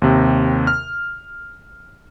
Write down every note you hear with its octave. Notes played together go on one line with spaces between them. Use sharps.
D#2 C3
F6